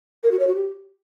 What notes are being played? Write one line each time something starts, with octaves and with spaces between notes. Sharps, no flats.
A#4
F#4
C#5
F#4
G4